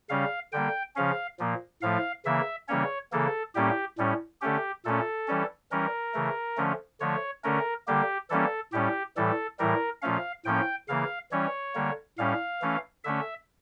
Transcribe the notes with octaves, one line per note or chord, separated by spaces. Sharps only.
C#3 G3 C#4 F5
D3 G3 A#3 G5
C#3 F3 C#4 F5
A#2 F3 A#3
A2 F3 A3 F5
C#3 E3 A#3 E5
C#3 E3 G3 A#3 C#4 C#5
C#3 E3 A#3 A4
A2 G3 A#3 C#4 G4
A2 G3 C#4
D3 A3 C#4 G4
A#2 A3 C#4 A4
E3 G3 C#4
E3 G3 C#4 A#4
C#3 E3 A3
D3 F3 A3 C#4
D3 F3 A3 C#5
D3 A3 C#4 A#4
D3 G3 A#3 G4
E3 G3 A#3 C#4 A4
A2 G3 C#4 G4
A2 E3 G3 A4
A2 E3 G3 A#4
A#2 F3 A3 C#4 F5
A2 F3 A#3 C#4 G5
C#3 E3 A#3 F5
E3 G3 C#4 C#5
D3 G3 A#3
A2 G3 C#4 F5
E3 A3 C#4
D3 A3 C#4 E5